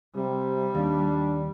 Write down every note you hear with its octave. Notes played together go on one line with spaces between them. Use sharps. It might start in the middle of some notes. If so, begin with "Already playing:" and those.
C3 G3
D#2 D4